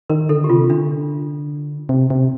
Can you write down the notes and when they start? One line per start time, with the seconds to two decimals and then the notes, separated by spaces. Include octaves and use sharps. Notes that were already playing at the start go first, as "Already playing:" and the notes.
0.09 D#3 A#4
0.29 D3 A4
0.44 G4
0.49 C3 F4
0.70 D3 D4
1.89 C3
2.10 C3